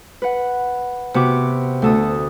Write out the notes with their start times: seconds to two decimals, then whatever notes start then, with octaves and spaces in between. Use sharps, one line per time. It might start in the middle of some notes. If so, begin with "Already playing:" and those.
0.22 B4 F#5
1.14 C3 B3 F#4 D6
1.82 D2 A4 D#6